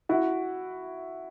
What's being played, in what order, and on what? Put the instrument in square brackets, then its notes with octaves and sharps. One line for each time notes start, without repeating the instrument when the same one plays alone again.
[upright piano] E4 F#4